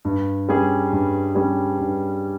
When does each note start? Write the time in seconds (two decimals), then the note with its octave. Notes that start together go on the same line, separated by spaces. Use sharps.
0.05 G2
0.49 G3 C#4 G#4
0.92 G2
1.35 G3 C#4 G#4
1.80 G2